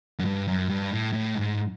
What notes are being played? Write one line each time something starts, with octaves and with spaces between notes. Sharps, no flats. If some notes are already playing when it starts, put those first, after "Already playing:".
F#2
G2
F#2
G2
A2
A2
G#2